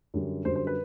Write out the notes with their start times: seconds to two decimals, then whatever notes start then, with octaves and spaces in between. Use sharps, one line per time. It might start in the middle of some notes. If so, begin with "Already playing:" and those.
0.14 F#2 D3 G3
0.45 F#2 D3 G3 C5
0.55 C5
0.67 B4